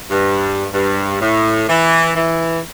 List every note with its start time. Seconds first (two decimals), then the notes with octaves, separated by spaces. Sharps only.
0.10 G2
0.73 G2
1.21 A2
1.68 E3
2.15 E3